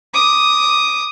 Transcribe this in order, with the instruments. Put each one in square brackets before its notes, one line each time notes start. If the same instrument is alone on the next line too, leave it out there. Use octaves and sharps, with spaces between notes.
[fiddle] D6 D#6